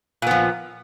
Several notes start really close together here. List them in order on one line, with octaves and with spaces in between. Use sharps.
A#2 B3 F3